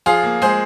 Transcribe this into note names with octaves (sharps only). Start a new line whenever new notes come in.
F3 F4 G#4
A#3
G#3 G#4 C5